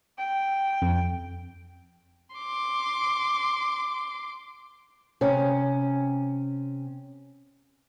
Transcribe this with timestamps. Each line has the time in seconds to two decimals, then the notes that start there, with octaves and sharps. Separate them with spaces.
0.18 G5
0.82 F2
2.36 C6 D6
5.21 C3 C#4